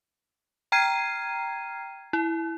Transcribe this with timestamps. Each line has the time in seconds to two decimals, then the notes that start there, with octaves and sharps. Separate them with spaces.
0.72 G5 A#5 F6 G#6 C7 D#7
2.13 E4